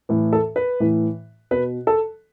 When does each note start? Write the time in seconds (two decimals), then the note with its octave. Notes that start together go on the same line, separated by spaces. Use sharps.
0.09 A2 E3
0.33 A4
0.56 B4
0.80 A2 E3
1.51 B2 B4
1.87 A4